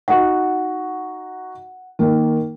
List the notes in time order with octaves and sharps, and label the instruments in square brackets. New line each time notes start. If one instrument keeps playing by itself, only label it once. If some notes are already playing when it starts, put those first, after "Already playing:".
[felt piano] D#4 F#4 [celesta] F#5
[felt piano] D#3 A#3